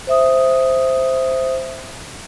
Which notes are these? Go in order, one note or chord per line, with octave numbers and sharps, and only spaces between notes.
C5 E5 D#6